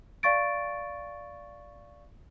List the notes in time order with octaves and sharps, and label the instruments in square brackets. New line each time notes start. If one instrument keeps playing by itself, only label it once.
[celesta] D5 F5 C#6 A6 D7